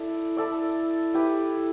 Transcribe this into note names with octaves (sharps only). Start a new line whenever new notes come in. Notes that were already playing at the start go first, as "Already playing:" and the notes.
Already playing: E4 A4 D5
E4 A4 D5
E4 G4 B4